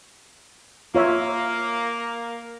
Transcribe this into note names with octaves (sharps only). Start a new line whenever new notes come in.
A#3 F4 C#5 E5